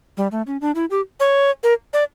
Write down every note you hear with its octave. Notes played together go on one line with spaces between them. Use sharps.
G3
A3
C#4
D4
E4
G4
C#5
A#4
D5